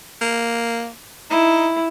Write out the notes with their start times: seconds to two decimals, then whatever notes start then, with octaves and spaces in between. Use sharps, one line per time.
0.21 A#3
1.30 D#4 E4